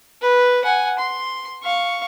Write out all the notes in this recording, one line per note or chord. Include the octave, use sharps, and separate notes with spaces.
B4
F#5 G#5
C6
F5 C#6